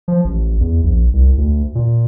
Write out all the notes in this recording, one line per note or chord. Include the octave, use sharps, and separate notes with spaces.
F3
A1
E2
A#1
C2
D2
A#2